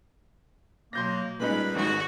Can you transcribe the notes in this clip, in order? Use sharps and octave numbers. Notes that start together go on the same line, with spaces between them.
B2 F#3 A#3 C6 G6 A#6
A#2 G3 G#3 C#4 D#4 B4 B5
G#1 G#2 F#4